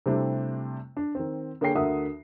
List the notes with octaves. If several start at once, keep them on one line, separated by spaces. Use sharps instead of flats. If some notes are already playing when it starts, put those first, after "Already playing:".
C3 G3 A3 C4 D4 E4
D4
D#3 C4
D3 A#3 G#4 C#5 G5 C7
D2 D3 A#4 E5 F#5 D#6